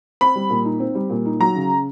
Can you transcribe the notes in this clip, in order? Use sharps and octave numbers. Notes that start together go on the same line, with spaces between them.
C4 B5
G3
A#2
D#4
C4
G3
A#2
D#4
F#3 A#5
C#3